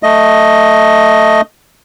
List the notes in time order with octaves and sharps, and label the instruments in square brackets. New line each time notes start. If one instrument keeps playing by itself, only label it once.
[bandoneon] A3 D#5